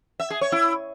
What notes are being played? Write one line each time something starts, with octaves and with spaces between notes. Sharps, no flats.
E5
G#4
C#5
E4